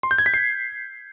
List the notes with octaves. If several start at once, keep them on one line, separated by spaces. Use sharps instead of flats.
C6
G6
G#6
B6
C7